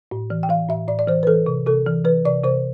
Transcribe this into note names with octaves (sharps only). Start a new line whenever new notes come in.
A2
E3
G5
E3 F5
A2 E5
A2 D5
D5
E3 C5
B4
E3 A4
C3
C3 A4
E3
E3 B4
C3 D5
C3 C5